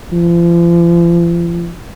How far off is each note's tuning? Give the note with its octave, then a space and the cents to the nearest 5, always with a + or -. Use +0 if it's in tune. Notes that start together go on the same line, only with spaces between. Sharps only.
F3 -40